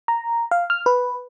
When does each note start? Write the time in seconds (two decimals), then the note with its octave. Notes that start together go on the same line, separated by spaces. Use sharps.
0.08 A#5
0.51 F5
0.70 F6
0.86 B4